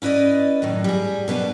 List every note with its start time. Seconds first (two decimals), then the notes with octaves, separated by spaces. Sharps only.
0.02 C#4 E4 B4 D5 D#5
0.62 F#2 A2 D#3
0.84 G3 G#4
1.28 B2 B3 C#4 D4